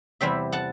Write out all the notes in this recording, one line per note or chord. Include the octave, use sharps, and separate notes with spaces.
E2 C3 G3 C4 E4 E5 G5
F#5 A5